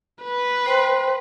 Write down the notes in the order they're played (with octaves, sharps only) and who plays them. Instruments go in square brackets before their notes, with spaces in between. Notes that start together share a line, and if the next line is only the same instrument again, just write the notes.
[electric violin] B4
[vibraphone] C5 G5 C6